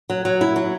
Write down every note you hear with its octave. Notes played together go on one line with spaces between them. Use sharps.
F#3
F#3
E4
F#3